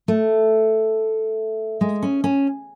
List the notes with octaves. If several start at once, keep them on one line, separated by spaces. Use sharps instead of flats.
A3
G#3
C#4
C#4